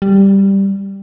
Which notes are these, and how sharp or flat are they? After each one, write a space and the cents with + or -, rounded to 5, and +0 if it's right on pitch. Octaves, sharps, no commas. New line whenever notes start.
G3 +0